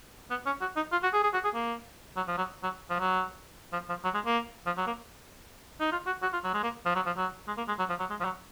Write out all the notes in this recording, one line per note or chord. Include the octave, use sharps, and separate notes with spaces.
B3
C#4
F#4
D#4
F4
F#4
G#4
G#4
F#4
G#4
A#3
F#3
F3
F#3
F#3
F3
F#3
F3
F3
F#3
G#3
A#3
F3
F#3
A#3
D#4
F4
F#4
F#4
F4
F#3
G#3
A#3
F3
F#3
F3
F#3
G#3
A#3
G#3
F#3
F3
F#3
G#3
F3
F#3